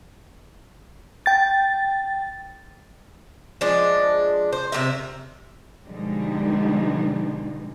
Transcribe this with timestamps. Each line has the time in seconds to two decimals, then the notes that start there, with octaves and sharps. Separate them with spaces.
1.26 G5 A6
3.61 F3 G#3 D4
4.53 C5
4.72 C3 E3 A#4 E5
5.87 B2 D3 F3 G3 G#3 D#4